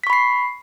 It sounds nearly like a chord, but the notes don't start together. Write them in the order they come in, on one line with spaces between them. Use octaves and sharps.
B6 C#6 B5 C7